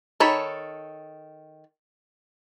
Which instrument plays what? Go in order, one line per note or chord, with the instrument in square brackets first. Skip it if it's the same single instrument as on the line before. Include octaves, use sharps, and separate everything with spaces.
[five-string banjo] D#3 A4 C#5 B5